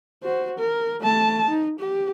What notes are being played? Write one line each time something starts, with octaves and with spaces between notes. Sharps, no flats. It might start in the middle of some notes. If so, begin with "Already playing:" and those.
F#4 C5
A#4
A3 A5
D#4
G4